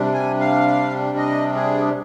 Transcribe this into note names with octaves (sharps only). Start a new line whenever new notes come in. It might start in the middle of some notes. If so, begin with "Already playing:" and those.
Already playing: C3 G3 D4
G#5
F5
D#5
G#4